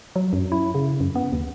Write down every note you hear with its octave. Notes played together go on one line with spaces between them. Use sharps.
F#3
F#2
E4
C#3
F#2
B3
D#2